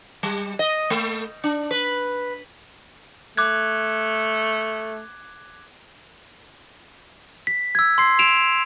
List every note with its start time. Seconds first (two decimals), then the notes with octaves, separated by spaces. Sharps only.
0.23 G3
0.59 D#5
0.90 A3
1.44 D4
1.71 B4
3.37 A3 D6 F#6 G#6
7.47 B6
7.75 E6 G#6
7.98 C6 C7
8.19 D7 E7 F7